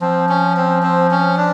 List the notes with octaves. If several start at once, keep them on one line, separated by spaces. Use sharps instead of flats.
F3 C4
C#4
C4
C4
C#4
D4